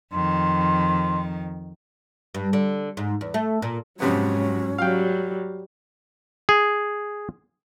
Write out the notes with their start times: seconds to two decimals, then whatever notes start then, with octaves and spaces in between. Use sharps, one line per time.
0.12 F2 D#3 C6
2.35 G2
2.53 D3
2.97 G#2
3.21 E2
3.34 A3
3.62 A#2
4.00 F2 G#2 C3 F#3 B3 C#4
4.78 F#3 G3 F5 G5
6.49 G#4